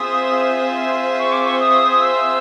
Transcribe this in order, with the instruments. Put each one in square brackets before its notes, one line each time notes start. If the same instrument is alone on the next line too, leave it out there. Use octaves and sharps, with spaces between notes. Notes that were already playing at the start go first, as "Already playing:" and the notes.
Already playing: [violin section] C4 F4 G#4 C5 E5 [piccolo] D#6
[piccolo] C#6
D6
C#6
D#6
D#6
E6